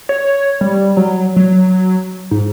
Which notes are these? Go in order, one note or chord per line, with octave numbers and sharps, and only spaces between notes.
C#5
G3
F#3
F#3
G#2